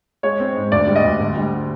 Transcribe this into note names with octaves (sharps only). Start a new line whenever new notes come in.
G#3 C#5
C4
G#2
D2 D5
G3
D#5
D2
D3
G3